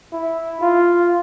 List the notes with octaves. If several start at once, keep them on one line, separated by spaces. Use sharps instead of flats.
E4
F4